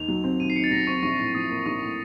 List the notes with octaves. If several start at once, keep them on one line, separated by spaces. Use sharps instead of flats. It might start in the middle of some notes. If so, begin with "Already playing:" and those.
Already playing: D#2 D#3 F7
F#3
C4
D#2 D#7
C7
D#3 C#7
A6
F#3 A#6
C4 C#6
A#1 C#6
A2
F3 D#6
A#3
A#1 C#6
A2